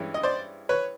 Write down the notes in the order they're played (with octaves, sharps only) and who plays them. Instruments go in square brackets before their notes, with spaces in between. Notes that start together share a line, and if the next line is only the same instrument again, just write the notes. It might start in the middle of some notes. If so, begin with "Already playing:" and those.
Already playing: [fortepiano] G2 E3 G#3 C#4
D#5
C5 D5
B4 C#5